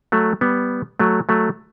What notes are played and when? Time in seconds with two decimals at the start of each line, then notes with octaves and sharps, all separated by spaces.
0.12 F#3 A3
0.41 G3 B3
1.00 F#3 A3
1.29 F#3 A3